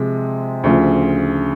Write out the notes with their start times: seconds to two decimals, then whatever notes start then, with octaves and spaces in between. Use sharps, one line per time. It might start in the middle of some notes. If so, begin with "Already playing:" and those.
Already playing: C3 F3 G#3
0.64 D2 C#3 F3